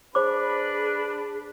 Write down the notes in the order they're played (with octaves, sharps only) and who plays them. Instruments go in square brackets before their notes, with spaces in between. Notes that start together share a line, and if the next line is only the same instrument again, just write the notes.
[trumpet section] D4 B4 B5 [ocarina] G#4 [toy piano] C5 D6